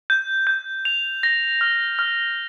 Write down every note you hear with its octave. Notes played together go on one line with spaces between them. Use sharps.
G6
G6
F7
A#6
F6
F6